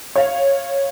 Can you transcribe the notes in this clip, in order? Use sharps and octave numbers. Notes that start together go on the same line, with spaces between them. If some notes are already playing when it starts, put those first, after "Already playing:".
C#5 F5